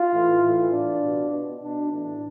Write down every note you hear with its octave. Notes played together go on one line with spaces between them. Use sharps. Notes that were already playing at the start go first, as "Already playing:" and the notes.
Already playing: F4
A2 E3
A2 E3
A2 E3 D4
B2
B2
B2 D4
A2 E3 D4